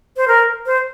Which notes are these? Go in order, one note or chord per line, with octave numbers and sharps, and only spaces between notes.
C5
A#4
C5